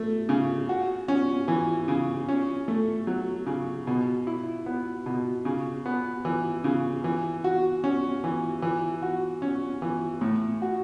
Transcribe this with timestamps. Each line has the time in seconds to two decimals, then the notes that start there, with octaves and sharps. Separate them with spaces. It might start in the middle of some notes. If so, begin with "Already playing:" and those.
Already playing: A3
0.29 C#3
0.69 F#4
1.08 C#4
1.48 E3
1.88 C#3
2.28 C#4
2.68 A3
3.07 F#3
3.47 C#3
3.87 B2
4.27 E4
4.66 B3
5.06 B2
5.45 C#3
5.86 B3
6.25 E3
6.64 C#3
7.04 E3
7.44 F#4
7.84 C#4
8.24 E3
8.62 E3
9.02 F#4
9.42 C#4
9.82 E3
10.21 A2
10.62 F#4